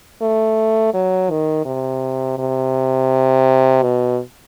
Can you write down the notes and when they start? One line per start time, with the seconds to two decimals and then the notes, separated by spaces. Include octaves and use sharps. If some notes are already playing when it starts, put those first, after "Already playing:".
0.22 A3
0.94 F#3
1.30 D#3
1.65 C3
2.38 C3
3.82 B2